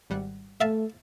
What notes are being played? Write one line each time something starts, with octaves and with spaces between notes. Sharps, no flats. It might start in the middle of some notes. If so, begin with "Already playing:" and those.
G#1 G3 F#5
A3 E5 F5 A5